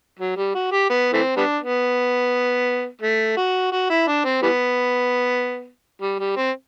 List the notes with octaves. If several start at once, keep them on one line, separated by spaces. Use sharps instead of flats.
F#3
G3
F#4
G4
B3
E3 A3 C4
G3 B3 D4
B3
A3
F#4
F#4
E4
D4
C4
E3 G3 B3
G3
G3
C4